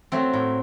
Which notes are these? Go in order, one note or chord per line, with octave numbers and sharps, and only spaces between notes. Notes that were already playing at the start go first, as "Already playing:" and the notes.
F#3 A3 C4
A2